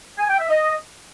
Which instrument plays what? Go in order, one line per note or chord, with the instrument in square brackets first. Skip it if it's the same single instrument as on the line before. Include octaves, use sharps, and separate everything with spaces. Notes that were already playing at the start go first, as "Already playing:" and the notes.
[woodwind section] G#5
G5
E5
D#5